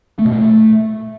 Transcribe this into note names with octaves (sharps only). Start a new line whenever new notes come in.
A3
B2
A#2
A3